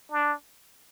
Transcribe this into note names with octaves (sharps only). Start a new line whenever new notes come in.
D4